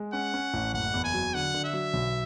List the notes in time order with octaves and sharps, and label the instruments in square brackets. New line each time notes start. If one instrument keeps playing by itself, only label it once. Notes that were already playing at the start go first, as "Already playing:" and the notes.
Already playing: [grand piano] G#3
[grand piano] C#4 [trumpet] F#5
[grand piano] C#4
A1
[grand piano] F#1 [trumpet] F#5
[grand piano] E2
[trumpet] G#5
[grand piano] F#3
[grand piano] D3 [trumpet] F#5
[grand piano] D3
[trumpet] E5
[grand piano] F#3
B1